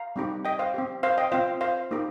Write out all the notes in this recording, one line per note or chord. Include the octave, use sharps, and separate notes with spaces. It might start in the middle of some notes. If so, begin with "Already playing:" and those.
Already playing: F5 A#5
G3 C4 D#4 G4
D#5 G5
C5 F5
C4 G4
C5 F5
D#5 G5
C4 F4 C5 F5
C5 F5
A#3 D#4 G4